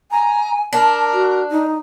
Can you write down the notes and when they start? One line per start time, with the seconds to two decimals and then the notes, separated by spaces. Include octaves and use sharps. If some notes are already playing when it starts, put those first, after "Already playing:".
0.11 G#5 A#5
0.73 D4 A#4 A5
1.14 F#4
1.51 D#4